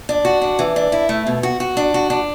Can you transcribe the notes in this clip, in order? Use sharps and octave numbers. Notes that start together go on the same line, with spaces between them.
D4
F#4
D4
E3
D4
E4
A3
B2
F#4
F#4
D4
F#4
D4